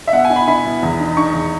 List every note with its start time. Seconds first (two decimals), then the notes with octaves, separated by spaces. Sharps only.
0.07 E5
0.13 B2 F#5
0.25 G#5
0.30 E4
0.36 B5
0.48 E4 B5
0.65 B2
0.83 E2
1.00 D#4
1.17 D#4 C#6
1.34 E2